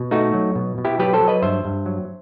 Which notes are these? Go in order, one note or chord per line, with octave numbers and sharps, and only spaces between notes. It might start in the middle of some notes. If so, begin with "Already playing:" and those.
Already playing: B2
A3 D#4 F#4
F#3
B2
B2
E4 G4
F#3 G4 B4
A4 C5
F#3
B4 D#5
G2 C5 E5
G2
F#3